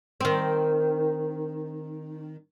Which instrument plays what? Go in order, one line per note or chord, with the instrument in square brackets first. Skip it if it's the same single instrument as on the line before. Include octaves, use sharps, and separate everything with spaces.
[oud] D#3 C4